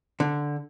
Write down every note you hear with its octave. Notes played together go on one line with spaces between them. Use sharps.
D3